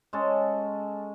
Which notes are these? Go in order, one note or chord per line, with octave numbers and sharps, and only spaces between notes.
G#3 C#4 A4